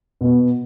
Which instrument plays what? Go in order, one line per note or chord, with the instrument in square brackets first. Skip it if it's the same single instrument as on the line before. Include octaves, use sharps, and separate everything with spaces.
[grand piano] B2 B3